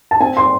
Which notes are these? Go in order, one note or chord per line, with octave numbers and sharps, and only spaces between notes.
A5
C4 G#5
C6